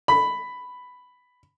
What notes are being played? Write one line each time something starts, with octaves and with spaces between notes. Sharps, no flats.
B5